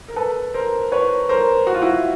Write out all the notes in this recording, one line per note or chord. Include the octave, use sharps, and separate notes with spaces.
A#4
A4 B4
A#4 C5
B4 C#5
A#4 C5
F#4
F4
E4 F#4